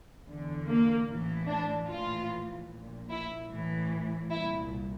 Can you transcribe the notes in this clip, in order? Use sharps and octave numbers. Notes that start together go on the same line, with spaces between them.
E2 D3
A#3
A1 A2 E3
D4
A#1 A2 E3 F4
A#1 A#2
E4
A1 A2 E3
C2 A#2 E4